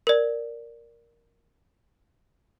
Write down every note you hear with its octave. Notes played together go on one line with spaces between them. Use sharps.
A#4 D5